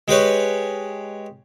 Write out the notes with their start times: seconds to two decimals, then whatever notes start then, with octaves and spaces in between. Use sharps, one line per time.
0.08 G#3 G4 B4 C#5